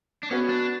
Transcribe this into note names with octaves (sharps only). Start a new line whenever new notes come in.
D4
B3 C#4 F#4 B4
D4